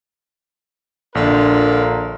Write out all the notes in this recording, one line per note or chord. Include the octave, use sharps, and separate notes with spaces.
A#1 D3 F4 A#4